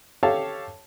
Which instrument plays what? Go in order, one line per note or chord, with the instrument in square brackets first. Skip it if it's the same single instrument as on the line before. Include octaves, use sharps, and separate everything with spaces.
[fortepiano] G4 A4 C#5 F5 A5